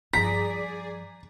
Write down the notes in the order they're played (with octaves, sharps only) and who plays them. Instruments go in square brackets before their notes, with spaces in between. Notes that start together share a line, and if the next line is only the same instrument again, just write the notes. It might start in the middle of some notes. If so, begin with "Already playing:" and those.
[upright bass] G2 F3 [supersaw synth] G#4 D5 [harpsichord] A#5 [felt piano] B6